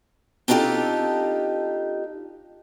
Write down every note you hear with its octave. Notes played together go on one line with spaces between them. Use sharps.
C4 D4 D#4 F4 G4 A4